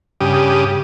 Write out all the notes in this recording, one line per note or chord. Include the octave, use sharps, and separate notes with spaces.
G2 C#3 G4 D#6